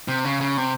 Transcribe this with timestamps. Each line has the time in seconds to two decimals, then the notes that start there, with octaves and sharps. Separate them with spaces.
0.08 C3
0.25 C#3
0.41 C#3
0.57 C3